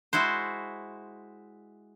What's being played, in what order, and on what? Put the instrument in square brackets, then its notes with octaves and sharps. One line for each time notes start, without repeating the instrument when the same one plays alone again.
[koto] G#3 E4 F#4 C5